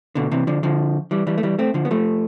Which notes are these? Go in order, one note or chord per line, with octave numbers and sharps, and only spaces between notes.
B2 D3
C3 E3
D3 F3
D3 F3
E3 G3
E3 G3
A3
E3 G3
A3 C4
D3 F3
B3
F3 A3